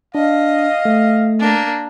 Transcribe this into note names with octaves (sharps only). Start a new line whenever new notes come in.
D4 D#5 F5
A3
A#3 D4